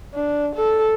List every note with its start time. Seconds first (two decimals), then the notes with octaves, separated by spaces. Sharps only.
0.14 D4
0.55 A4